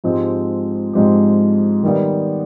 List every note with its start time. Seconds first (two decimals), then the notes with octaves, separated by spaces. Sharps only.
0.04 G#2 F3 G#3 C4 G4
0.93 G#2 F3 G#3 C4 G4
1.83 D#3 G3 B3